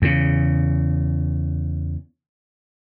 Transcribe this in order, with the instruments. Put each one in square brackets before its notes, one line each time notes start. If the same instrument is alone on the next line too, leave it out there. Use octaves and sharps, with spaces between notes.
[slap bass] E2 C#3